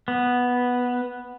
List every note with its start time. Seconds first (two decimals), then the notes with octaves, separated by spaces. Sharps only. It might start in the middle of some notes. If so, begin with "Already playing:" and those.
0.08 B3